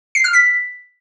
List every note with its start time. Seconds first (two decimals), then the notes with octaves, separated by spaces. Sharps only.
0.15 C7
0.24 F6
0.33 B6